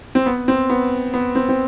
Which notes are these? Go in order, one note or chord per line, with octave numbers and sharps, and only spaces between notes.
C4
B3
C4
B3
B3
C4
C4